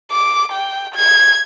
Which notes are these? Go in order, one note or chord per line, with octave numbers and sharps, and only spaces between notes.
D6
G5
G#6